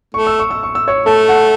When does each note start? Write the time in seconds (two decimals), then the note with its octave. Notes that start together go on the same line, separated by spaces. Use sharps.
0.14 A3 C#6
0.27 E6
0.39 C#6
0.51 E6
0.63 C#6
0.75 E6
0.88 C#5 C#6
1.06 A3 A4 A5
1.29 F#5